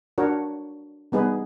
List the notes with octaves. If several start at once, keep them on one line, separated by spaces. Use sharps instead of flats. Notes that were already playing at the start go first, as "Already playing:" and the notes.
D4 F#4 A#4 C#5
G3 B3 D#4 G#4 B4